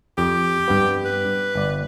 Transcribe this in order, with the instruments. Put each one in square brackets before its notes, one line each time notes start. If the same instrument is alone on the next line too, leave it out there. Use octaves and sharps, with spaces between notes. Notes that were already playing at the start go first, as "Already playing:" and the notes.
[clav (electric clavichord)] F2 [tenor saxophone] G4
[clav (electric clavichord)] G2 G3 B3
[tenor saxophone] B4
[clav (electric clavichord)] G1 D5